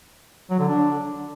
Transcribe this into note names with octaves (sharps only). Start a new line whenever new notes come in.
F#3
D3
D4